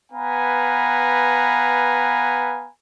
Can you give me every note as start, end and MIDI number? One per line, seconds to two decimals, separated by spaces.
0.12 2.69 59
0.12 2.69 71
0.12 2.69 77
0.12 2.69 80
0.12 2.69 82